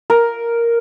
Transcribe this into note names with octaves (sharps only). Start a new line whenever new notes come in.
A#4